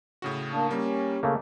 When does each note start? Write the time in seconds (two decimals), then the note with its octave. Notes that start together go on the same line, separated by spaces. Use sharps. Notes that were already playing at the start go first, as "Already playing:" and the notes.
0.22 A2 C#3 F#4
0.51 A#3 D4
0.71 G3 A#3 C#4 G4
1.23 C#3 A3 A#3